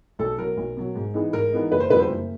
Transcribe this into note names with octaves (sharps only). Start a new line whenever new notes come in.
B1 A4
B2 F#3 A#4
B1
B2 F#3
G#2
E3 G#3 B3 D#4
G#2 A#4
E3 G#3 B3 D#4
F#1 B4
C5
F2 D3 G3 B3 B4
C5
F#1